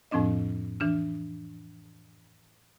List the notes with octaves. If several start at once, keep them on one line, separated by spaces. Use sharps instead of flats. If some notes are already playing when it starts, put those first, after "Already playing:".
F2 A2 F3 C4 D4 D#5
E3 D4 F6